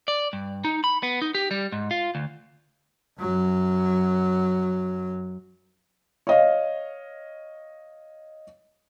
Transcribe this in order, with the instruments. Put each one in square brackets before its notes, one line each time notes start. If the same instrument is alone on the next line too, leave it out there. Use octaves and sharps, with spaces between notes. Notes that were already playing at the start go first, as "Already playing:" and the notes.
[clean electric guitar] D5
G2
D#4
B5
B3
D#4
G4
G3
G#2
F4
D2
[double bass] F#2 F#3
[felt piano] C#5 D#5 F5